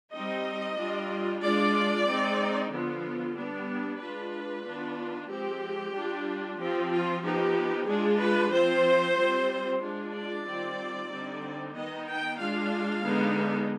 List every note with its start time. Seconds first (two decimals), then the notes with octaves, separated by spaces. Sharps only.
0.13 G3 C4 D#4 D#5
0.77 G3 D4 F4
1.43 G#3 D4 F4 D5
2.07 G#3 C4 D#4
2.71 D3 F3 B3 F4
3.36 G3 B3 D4
4.00 G#3 D4 F4 B4
4.66 D#3 B3 D4 F4
5.30 F3 G#3 C4 G4
5.94 G3 D4 F4
6.58 F3 C4 F4 G4
6.91 F4
7.23 F3 B3 D#4 G4
7.87 G#3 D4 F4 G#4
8.20 B4
8.52 F3 C4 F4 C5
9.17 G3 C4 F4
9.81 G#3 D4 F4
10.13 D5
10.46 D#3 G3 C4 F4
11.10 D3 G3 C4 D#4
11.74 D#3 B3 D#4 D#5
12.07 G5
12.39 G#3 D4 F4 F5
13.03 D3 G#3 B3 D#4